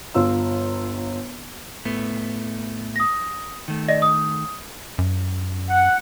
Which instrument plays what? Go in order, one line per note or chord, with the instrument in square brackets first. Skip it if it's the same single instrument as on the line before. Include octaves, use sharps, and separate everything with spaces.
[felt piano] G1 F4 E6
[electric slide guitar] A2 A3 B3
[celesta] D#6 A#6
[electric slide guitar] D#3 A3
[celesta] D5 D#5 A#6
D#6
[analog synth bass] F#2
[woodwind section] F#5